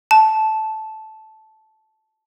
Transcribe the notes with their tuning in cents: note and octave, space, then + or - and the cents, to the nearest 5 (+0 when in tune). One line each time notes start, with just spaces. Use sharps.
A5 -10